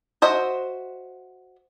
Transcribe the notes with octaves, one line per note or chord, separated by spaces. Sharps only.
F#4 C5 D#5 E5